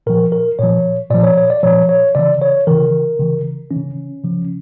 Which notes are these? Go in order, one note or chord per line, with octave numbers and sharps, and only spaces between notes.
A#2 F3 A#4
A#4
A#2 F3 C#5
A#2 F3 D5
C#5
C#5
D5
A#2 F3 C#5
C#5
C#3 E3 D5
C#5
C#3 E3 A#4
C#3 E3
E3 C#4
C#3
C#3 F3